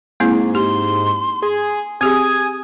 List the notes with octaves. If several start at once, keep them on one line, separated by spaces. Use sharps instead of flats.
G#2 A#3 C4 E4
G4 C6
G#4
C4 G4 G#4 G#5 D#6